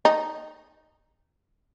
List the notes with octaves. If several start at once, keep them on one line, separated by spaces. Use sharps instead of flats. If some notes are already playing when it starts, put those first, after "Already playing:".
D#4